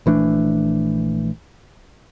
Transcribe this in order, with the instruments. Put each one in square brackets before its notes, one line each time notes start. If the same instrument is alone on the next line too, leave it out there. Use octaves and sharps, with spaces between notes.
[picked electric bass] A#1 E3 A3 D4